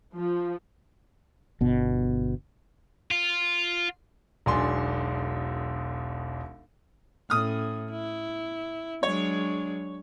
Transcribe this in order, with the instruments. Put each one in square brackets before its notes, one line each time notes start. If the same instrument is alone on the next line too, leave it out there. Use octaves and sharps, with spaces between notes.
[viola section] F3
[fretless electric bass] G1 B2
[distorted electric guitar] F4
[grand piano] E1 B1 D4 G#5 C6
[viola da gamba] A2 C#4 [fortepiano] D#6 F6
[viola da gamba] E4
[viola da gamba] F#3 G#3 D4 [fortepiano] C#5